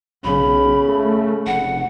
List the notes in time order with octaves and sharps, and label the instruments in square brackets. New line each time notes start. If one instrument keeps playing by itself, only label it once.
[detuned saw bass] B1 [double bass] C#3 [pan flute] B5
[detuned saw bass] A3
[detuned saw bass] F1 [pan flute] F#5